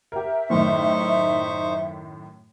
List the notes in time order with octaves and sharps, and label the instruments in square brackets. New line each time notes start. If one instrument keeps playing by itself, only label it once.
[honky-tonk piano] G4 A#4 [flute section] E5
[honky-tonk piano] F#2 A2 D#3 [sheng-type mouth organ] D#4 C5 C#6